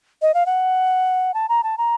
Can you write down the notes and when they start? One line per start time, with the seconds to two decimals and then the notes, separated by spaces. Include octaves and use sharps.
0.22 D#5
0.34 F5
0.46 F#5
1.34 A5
1.49 A#5
1.64 A5
1.78 A#5